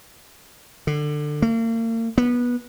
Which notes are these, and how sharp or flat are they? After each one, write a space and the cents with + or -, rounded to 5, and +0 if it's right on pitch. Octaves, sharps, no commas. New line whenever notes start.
D3 +20
A#3 -40
B3 -20